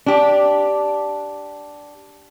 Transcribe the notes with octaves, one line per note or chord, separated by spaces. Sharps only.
D4 G4